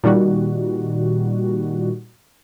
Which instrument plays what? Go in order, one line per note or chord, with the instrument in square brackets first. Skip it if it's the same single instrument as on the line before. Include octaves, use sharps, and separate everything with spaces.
[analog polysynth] A#2 D#3 G3 F#4